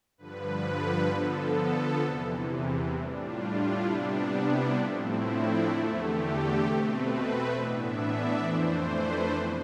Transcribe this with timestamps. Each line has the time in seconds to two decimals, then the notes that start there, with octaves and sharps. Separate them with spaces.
0.18 G2 D3 F3 B4
1.09 D3 F3 B3 A4
2.01 E2 C3 E3
2.93 A2 G3 D4
3.23 F4
3.53 E4
3.83 C3 G3 B3 D4 E4
4.14 D4
4.45 E4
4.75 A2 F3 A3 C4 F4
5.06 E4
5.36 D4
5.67 E2 D3 A3 E4
5.97 G4
6.28 A4
6.58 B2 A3 C4 G4
6.88 B4
7.19 E5
7.50 A2 E3 B3 D4 D5
7.80 E5
8.11 D5
8.41 F2 E3 A3 D4 C5
8.87 B4
9.33 B2